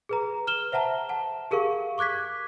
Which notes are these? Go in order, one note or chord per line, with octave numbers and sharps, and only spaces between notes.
G#4 B4 A#5
F6 E7 G7
C5 E5 F#5 A5 A#5
F#5 A5
G4 G#4 A#4 F5 C#6
C#6 D6 F#6 G#6 B6